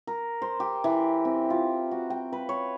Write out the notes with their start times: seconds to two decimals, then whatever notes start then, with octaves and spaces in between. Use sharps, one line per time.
0.07 A#4
0.42 C5
0.60 G4
0.84 E3
1.25 C4
1.50 F4
1.91 F#4
2.10 G5
2.33 B4
2.49 C#5